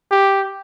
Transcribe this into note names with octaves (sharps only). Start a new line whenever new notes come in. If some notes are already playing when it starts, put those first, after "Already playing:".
G4